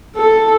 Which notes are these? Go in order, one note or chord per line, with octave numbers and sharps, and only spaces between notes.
A4